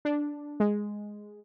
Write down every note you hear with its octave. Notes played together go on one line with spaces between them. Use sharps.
D4
G#3